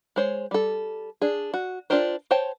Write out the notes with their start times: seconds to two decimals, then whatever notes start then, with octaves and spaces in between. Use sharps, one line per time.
0.16 G#3 C5 C#5
0.51 G3 A4
1.21 D4 G#4
1.54 F#4
1.90 D4 F4 G4 A#4 C5
2.31 C5 C#5 G5 A5